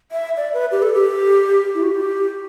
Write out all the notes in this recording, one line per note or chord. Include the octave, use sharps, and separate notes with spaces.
E5
D5
B4
G4
A4
G4
E4
F#4
G4